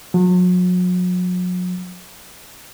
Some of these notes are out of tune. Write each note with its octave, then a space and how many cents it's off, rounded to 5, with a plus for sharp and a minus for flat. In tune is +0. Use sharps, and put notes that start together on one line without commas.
F#3 -40